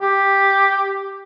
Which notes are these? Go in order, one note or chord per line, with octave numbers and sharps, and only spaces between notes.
G4